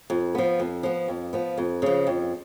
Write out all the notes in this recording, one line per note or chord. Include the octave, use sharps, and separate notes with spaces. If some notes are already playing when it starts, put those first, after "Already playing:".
F2
F3 B3
F2
F3 B3
F2
F3 B3
F2
C#3 F3
F2